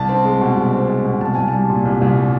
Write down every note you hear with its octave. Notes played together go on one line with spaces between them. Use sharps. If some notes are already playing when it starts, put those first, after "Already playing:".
Already playing: C2 A5
C4
G#3
B2
C2
C4
G#3
B2
C2 A5
C2 G#5
A5
G3
A#2
C2
C2
G3